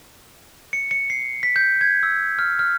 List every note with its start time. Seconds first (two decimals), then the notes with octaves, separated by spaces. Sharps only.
0.73 C#7
0.91 C#7
1.10 C7
1.43 B6
1.56 G6
1.81 G#6
2.03 E6
2.39 F6
2.59 F6